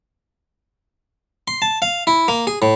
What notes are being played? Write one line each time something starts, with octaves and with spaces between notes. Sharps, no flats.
C6
A5
F5
E4
A#3
G#4
A2